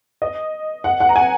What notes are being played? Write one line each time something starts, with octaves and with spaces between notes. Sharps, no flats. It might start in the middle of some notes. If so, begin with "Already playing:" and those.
D#5
F#5
F#5
A#5
G#5